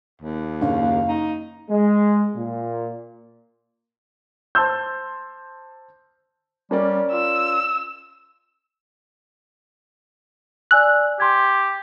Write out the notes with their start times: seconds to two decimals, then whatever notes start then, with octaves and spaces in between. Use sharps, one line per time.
0.22 D#2
0.61 F#1 F5
1.08 D#4
1.70 G#3
2.35 A#2
4.55 C5 A5 C6 E6 G6
6.71 G3 C#4 A#4 D5
7.12 F4 E6
10.71 D5 G#5 E6 F#6
11.20 G4 C6 G#6